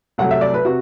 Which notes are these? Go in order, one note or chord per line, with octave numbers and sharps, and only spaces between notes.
C2 C3 F#3 A3 F#5
E5
D5
B4
C3 F#4